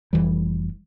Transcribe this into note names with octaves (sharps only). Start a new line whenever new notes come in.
F1 B1 E3 G3